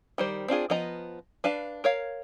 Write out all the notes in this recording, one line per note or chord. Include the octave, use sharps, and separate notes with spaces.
D#3 G3 C5
C4 D4 F4 G#4
F3 B3 D#5 A#5
D4 B4 F5 A5
A#4 C#5 F5